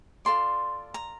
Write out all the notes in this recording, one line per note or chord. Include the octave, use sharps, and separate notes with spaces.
F4 A4 D5 C6
A#5